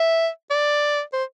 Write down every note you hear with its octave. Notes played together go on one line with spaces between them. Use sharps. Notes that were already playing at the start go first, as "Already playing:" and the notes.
Already playing: E5
D5
C5